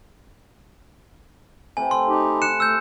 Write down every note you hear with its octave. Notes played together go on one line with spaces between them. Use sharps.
C3 A3 E4 G#5
C6
D#4 G4
F#6 C#7 E7
A3 E6 G6